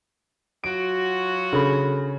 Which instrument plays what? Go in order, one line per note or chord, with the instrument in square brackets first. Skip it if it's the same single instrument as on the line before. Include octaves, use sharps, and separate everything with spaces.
[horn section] F#3 F4 F#4 [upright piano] D7
[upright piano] C#3 [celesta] D4 A4 B5